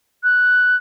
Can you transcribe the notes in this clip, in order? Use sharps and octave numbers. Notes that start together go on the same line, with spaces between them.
F#6